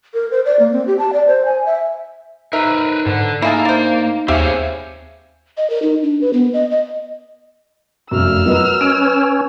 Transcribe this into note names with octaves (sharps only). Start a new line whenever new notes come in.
A#4
C5
D5
A#3
C4
G4
A5
D5
C5
G#5
E5
D#4 A#4 B4 E5 A#5
G#2 D3
A#3 D#4 E4 G#4 A4
D4 C5
D#2 C4 G4 G#4 C#5 E5 F5
D#5
A#4
D#4
D4
B4
B3
D#5
D#5
F1 F#2 E6 F6
F#3 A#4 B4 D#5
C#4 D7